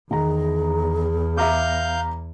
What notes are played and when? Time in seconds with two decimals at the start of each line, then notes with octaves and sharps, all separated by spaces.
0.11 E2 D#3 G#4 A#5
1.37 E5 F5 A#5 D6 G6